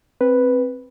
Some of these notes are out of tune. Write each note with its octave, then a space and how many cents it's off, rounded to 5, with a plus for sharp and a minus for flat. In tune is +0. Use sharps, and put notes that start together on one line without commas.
C4 +10 B4 +0